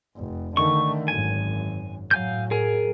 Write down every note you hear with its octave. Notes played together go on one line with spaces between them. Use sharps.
F1
D3 D#3 A3 C#6
G#1 F#2 G#5
A2 F#3 F5 G#5 G6
G#4 A#4 G#5